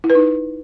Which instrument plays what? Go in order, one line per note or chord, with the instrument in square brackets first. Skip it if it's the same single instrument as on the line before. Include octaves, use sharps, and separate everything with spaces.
[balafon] E4
B4
D#4